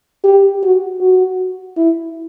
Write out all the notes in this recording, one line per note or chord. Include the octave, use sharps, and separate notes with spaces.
G4
F#4
F#4
E4